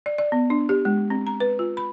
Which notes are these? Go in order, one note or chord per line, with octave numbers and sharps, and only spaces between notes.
D5
D5
B3
D4
G4
G#3
C4
A#5
B4
F4
B5